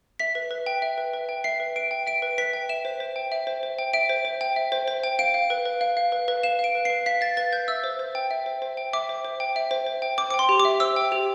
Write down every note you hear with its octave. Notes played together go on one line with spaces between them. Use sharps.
E5 B6
B4
B4
G5
E5
B4
B4
G5
E5 C7
B4
B4 D7
G5
E5 D7
B4
B4 B6
G5
E5 E7
C5
C5
G5
E5
C5
C5
G5
E5 D7
C5
C5
G5
E5
C5
C5
G5
F5 D7
F5
B4
B4
F5
F5
B4
B4
F5 E7
F5 D7
B4
B4 C7
F5 B6
F5 A6
B4 A6
B4 G6
E5 E6
C5
C5
G5
E5
C5
C5
G5
E5 D6
C5
C5
G5
E5
C5
C5
G5
C5 D6
D6
G5
C6
G4
D6
E5
C5 E6
G5
G4